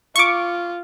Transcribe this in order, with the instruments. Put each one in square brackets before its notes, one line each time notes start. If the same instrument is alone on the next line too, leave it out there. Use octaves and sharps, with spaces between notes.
[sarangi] F4 [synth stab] C#6 D6